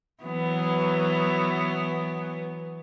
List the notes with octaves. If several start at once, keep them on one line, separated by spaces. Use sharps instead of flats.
E3 F#3 B3